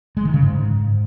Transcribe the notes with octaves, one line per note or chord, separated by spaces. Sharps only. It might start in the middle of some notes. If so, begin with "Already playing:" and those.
G#3
D#3
C#3
G#2